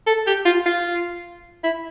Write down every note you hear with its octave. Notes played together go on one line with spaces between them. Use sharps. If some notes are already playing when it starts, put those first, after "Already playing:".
A4
G4
F4
F4
E4